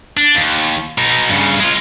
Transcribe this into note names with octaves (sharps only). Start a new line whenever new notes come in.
D4
D#2
B2 D#4
G2 C#3
G#3 F4